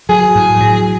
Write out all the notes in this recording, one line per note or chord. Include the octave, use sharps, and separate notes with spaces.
F#3 G#4
A2
F#3